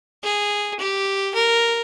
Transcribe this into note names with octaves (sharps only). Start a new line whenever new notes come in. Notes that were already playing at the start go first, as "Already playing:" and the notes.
G#4
G4
A#4